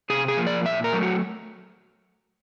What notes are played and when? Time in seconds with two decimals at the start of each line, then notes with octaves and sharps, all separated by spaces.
0.10 C3 G#4
0.28 G#4
0.37 F3 A#3
0.47 D5
0.65 A#2 E5
0.84 A#4
0.93 F#3 A3
1.03 F#4